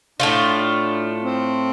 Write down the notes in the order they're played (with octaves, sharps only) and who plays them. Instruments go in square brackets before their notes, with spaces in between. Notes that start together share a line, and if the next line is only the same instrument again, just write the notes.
[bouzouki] A2 A3 F4 [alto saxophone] D4
[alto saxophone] C4